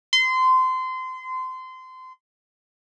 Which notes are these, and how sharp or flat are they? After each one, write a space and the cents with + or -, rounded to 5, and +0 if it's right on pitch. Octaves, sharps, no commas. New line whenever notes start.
C6 -25